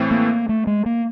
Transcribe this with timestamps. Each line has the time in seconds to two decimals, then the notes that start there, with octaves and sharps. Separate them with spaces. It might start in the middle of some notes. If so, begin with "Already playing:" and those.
Already playing: A2 E3 A3 C4
0.11 A#3
0.49 A3
0.67 G#3
0.86 A#3